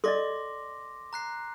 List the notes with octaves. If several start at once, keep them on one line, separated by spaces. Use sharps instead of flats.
A4 D5 D#5 C6 D6 A#6
A#5 F#6 C7